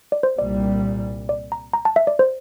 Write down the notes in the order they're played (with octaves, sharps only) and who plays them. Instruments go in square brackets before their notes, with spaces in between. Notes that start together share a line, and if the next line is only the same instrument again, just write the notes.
[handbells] D5
C5
[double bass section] C2 A#2 G3 [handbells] D5
[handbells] D5
A#5
A#5
A5
E5
D5
C5